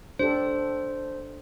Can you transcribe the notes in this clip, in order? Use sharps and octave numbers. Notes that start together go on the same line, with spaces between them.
D4 G4 A4 C5